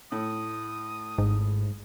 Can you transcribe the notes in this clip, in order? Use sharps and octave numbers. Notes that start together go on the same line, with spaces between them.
A2 D#6
G#1 G#2